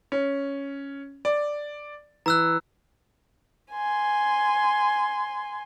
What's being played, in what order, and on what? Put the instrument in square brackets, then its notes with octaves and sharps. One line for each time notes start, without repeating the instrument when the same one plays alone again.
[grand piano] C#4
D5
[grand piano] E3 [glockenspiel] A#5 E6 F#6
[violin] G#5 C6